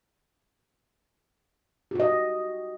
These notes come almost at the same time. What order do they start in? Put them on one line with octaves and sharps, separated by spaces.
G4 F#4 D#5